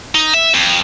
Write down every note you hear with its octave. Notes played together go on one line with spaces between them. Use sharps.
D#4
E5
F2